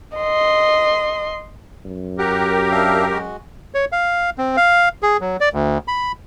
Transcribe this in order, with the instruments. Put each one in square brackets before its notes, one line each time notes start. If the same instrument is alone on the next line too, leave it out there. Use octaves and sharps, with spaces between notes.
[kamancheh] D#5 C6
[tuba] F#2
[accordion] G4 A#4 [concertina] F#5
[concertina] D4 E5 F5
G#3 F#4
[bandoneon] C#5
F5
C4
F5
G#4
F#3
D5
D2
B5